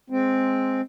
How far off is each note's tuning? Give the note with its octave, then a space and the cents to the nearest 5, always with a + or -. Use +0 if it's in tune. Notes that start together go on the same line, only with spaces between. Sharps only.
G#3 +5 C4 +0